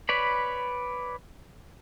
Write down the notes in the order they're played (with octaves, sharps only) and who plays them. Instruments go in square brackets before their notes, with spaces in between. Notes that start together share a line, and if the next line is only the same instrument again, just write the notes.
[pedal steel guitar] B4 C#5 D5 B5